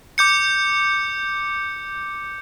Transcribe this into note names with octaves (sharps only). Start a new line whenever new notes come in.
D6 G6 C#7